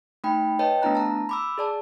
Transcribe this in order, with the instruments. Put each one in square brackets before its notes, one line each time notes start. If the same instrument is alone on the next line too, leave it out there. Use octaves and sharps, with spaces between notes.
[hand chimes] A3 D#4 G5 B5
B4 C#5 D#5 G5 A5
A3 B3 D4 E4 A#5 F#6
A5 A#5
B5 D6 E6
G#4 D5 A5